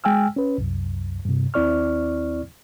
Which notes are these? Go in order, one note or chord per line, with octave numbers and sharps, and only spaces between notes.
G#3 G5 G#5 E6 F6
C#4 B4
C2 F#2
G2 C3
D#2 C4 E4 D5 C#6 F6